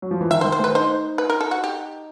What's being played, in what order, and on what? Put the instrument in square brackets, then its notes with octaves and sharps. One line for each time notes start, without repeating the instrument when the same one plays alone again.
[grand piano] F#3
F3
E3
[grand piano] D#3 [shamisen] E5
[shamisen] C5
[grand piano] D#3
[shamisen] C5
[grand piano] A3 [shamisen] B4
[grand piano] D#4 [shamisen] C5
[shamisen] B4
A#4
A4
F#4
G4